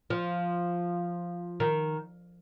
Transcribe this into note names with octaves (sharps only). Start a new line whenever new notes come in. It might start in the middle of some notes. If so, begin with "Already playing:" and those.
F3
D#3